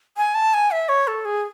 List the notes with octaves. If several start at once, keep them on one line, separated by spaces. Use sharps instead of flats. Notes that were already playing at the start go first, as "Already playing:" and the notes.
G#5
A5
G#5
E5
C#5
A4
G#4